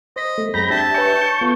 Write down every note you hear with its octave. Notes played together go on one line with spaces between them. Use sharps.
C5 D#5 B6
A3
F#2 G#3 C4 A#5 B5 G6 A#6
D4 G4 E5 A5
B4 C#5 G#5 C#6 G6
B3 F4 A4